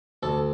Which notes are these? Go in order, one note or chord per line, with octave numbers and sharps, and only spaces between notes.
D2 A4